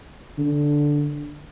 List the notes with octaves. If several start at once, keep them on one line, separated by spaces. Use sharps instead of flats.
D3